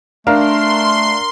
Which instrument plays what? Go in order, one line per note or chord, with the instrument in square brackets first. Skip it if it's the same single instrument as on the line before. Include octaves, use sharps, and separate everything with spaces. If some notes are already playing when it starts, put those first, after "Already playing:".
[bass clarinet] A3 [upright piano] D4 F5 [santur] A#4 [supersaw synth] C6